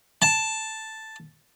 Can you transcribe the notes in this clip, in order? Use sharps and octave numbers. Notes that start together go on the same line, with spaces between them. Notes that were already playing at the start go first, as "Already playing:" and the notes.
A5